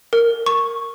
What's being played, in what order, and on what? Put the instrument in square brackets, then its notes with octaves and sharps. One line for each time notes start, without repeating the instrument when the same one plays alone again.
[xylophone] A#4
C#6